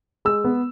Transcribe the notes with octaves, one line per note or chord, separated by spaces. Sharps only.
G#3 E6
B3